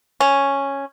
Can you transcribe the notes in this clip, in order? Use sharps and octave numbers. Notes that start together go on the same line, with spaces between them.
C#4